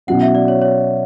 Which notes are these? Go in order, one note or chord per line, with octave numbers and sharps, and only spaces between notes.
B2 F#3 C#4 E4 F#5
E5
D5
C#5
C#5